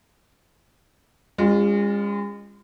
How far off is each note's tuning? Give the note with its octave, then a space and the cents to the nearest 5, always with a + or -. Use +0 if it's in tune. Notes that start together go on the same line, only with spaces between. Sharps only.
G#3 -40 C#4 +0 F4 +0